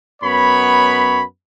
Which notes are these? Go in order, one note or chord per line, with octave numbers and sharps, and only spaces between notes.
F#2 B3 C#5 B5